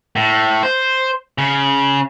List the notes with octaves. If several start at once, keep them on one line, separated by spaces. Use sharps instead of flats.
A2
C5
C#3